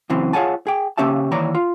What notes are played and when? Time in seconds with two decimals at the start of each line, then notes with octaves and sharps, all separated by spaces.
0.10 F#2 C#3 E3 C4
0.33 F4 G#4 C#5 F#5 G#5 A5
0.67 G#4 G5
0.98 C#3 A#3 C#4 G4 E5 A5
1.31 D#2 E3 C#5 D5 A#5
1.55 F4